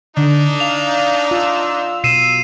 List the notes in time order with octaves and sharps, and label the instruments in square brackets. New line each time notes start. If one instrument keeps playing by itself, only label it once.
[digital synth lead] D3 [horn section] D4 D#4
[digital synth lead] F5 [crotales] F7
[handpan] F4 [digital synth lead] E6
[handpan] B2 [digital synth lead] E6 [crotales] C7 D#7 E7